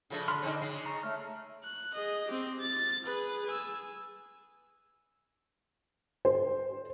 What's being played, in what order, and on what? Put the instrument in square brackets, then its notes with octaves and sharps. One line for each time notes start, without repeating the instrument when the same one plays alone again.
[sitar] C#3 F3 A3 [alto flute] D4
[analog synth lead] D3 [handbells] B5 C6 F6
[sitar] C4 C#4 D#4
[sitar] C#3 [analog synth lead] C7
[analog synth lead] A#5 [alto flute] C#6
[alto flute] A3 [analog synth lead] F6
[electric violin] F#6
G#4 D#5
C4 G4
A6
G#4 B4
G#5 E6
[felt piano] C5